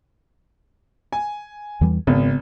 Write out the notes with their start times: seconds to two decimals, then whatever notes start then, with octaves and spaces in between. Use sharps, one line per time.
1.12 G#5
1.81 E2 E3 G3
2.07 G#1 C#3 B3